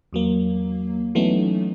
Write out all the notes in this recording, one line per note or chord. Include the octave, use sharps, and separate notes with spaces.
E2 F#3 A#3
E3 F#3 A3 B3 C#4 D#4